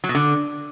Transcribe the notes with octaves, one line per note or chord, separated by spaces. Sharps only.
F#3
B2
D3